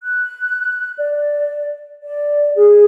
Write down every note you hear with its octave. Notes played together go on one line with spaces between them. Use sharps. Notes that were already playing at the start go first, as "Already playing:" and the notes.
F#6
D5
D5
G#4